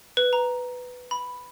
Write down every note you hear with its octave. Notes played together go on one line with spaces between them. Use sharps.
B4
A#5
B5